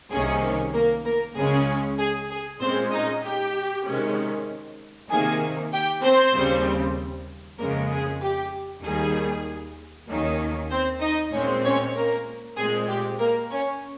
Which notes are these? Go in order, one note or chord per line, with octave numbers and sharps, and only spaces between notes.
C2 C3 D#3 A#3 C#4 G#4
A#3 A#4
A#3 A#4
C#2 C#3 G#3 C#4 G#4
G#4
G#4
A#2 G#3 C4 C#4 C5
D#4 D#5
G4 G5
C3 D#3 G#3 C#4
C3 D#3 A#3 G#4 G#5
G4 G5
C4 C5
D#2 C#3 G3 C4
F2 C#3 G#3 A#3 A#4
G#4
G4
D#2 D#3 G3 A#3 G#4
D#2 D#3 A#3 C#4
C4 C5
D#4 D#5
A#2 G#3 C4 C#4 C#5
C#4 C#5
A#3 A#4
A#2 G#3 C4 G#4
G4
A#3 A#4
C#4 C#5